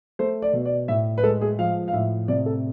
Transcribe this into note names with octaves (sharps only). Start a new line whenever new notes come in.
A3 C5
D5
B2
D5
A2 E5
B4
G#3 A4
G#4
F3 F5
F5
A2 E5
C3 D5
A4